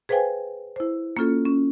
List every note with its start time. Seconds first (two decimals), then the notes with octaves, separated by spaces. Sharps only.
0.09 G#4 B4 C5 F5 G5 G#5
0.76 E4 C5
1.17 A#3 C#4 F4 A4
1.46 C#4